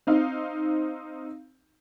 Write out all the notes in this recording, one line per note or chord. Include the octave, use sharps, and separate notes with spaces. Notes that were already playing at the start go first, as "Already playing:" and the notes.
C4 D#4 F5